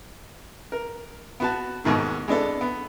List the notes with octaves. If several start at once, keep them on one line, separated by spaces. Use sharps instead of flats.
A#4
B3 F#4 A5
D#2 G#2 B2 D#3 A3
G#3 B3 D4 A4
B3